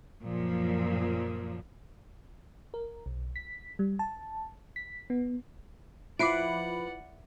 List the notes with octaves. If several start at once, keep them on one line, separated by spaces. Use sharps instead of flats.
F#2 A#2 F3
A#4
B1
B6
G3
A5
B6
B3
F3 E4 B4 D5 F#5 D6 C7 D7